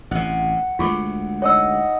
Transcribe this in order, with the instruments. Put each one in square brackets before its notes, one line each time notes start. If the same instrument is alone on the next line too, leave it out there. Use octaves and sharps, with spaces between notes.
[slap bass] A1 C3 [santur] F#5
[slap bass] D2 G#3 A3 [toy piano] F4 C#6 D6
[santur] D#4 D#5 F#5 [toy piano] C#5 E6